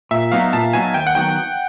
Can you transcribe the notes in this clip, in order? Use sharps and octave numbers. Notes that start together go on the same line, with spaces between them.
A#2 E5
F#3 B3 D#4 F5
A#2 A5
F#3 B3 D#4 G#5
D#2 G5
F#5
D#3 F#3 B3 G5